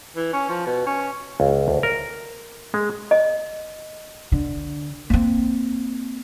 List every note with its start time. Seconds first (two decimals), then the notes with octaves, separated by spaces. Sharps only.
0.16 E3
0.33 C#4
0.49 F3
0.66 B2
0.87 C#4
1.40 C#2
1.68 D2
1.83 A#4
2.74 G#3
3.11 D#5
4.32 D3
5.10 A#3 C4